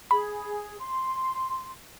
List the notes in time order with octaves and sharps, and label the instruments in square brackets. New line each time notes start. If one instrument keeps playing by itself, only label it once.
[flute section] G#4 [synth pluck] B5
[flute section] C6